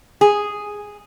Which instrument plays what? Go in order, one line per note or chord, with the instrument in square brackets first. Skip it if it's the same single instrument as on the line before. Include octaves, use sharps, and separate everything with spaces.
[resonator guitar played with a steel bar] G#4